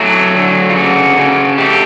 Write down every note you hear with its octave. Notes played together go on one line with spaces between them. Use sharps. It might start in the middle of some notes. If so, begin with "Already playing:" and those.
Already playing: F#3 A3 E4
D3
F4
C#3 F#4
C#3
A3 G4